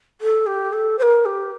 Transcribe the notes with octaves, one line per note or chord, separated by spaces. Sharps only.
A4
G4
A4
C5
A#4
G4